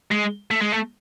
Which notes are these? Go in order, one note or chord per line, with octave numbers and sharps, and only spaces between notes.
G#3
A3
G#3
A3